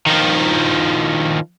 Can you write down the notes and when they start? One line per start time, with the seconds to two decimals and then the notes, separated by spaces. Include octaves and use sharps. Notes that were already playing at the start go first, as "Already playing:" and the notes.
0.07 D#3 F3